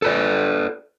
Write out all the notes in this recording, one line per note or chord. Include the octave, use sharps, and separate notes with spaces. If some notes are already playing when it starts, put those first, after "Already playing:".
A4 B4 D5